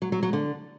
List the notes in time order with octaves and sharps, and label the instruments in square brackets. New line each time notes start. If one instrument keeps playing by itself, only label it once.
[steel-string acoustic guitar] F#3
F#3
F#3
D3